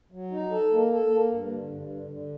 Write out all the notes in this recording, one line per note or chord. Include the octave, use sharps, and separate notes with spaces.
F#3
D#4
A4
A#3
A4
A#3
G2
D3
G2
D3
D3